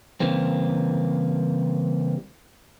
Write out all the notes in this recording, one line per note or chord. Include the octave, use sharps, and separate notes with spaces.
C#3 E3 G3 A#3 C4